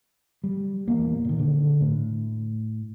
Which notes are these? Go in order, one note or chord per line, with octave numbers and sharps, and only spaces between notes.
G3
D#1 E2 A#3
A#2 D#3
D3
A2